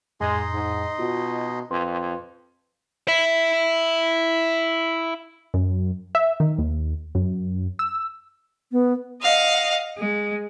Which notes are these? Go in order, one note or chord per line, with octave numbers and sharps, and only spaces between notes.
F2 A2 G#3 D#4 D#5 C6
G#2
B2 F4 F#4
F2 B4 C6
E4 E5
F#2
E5
D#3
D#2
F#2
E6
B3
D#5 F5 F#5
G#3